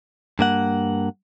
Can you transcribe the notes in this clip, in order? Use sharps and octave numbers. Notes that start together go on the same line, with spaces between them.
G2 A#3 F#5